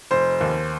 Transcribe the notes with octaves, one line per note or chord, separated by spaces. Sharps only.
F1 C5
D#2